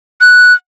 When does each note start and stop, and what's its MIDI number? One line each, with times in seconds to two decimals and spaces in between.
0.21 0.53 90